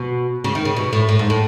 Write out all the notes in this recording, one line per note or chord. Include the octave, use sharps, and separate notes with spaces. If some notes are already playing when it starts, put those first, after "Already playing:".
Already playing: B2
C#3
D#3
C#3
B2
A2
A2
G#2
A2